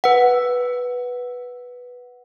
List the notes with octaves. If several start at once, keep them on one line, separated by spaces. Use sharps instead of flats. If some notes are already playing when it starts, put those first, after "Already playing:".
B4 F#5